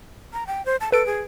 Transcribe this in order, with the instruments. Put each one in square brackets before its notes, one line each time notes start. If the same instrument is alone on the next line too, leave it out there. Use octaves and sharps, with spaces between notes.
[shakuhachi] A#5
G5
C5
A5
[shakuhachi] A4 [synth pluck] B4 D7
[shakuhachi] G#4